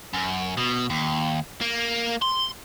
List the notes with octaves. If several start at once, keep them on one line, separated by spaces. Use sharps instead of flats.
F#2
B2
D#2
A#3
C6